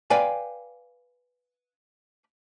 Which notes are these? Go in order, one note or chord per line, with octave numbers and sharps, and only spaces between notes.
B4 D5 F5 G5 G#5